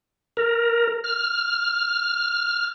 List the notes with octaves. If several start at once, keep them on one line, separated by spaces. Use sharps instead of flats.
A#4
F6